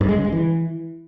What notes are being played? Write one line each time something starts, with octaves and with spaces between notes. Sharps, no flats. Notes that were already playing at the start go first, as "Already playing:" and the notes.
G2
G#3
C#3
G#3
E3